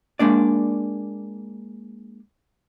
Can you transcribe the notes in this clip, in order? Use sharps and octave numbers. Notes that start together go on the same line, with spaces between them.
G#3 A#3 D4 D5